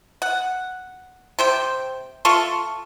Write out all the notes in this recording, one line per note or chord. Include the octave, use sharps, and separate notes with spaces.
F#5
C3 C5 G5
A3 F4 A4 C#6